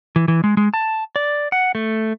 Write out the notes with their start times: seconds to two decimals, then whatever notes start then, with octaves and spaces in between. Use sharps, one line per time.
0.16 E3
0.28 E3
0.44 G#3
0.57 G#3
0.74 A5
1.16 D5
1.52 F#5
1.75 A3